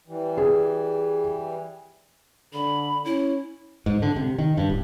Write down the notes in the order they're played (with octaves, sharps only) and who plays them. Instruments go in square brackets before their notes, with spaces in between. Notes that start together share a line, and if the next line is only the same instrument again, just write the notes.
[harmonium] E3 G3
[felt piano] G#4
[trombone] D3 [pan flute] B5
[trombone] C#4 [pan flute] E4
[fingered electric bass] G#2
D3
C3
D#3
G2
D1